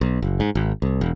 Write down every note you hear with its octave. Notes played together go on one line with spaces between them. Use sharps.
B1
F#1
G#2
G#1
C2
E1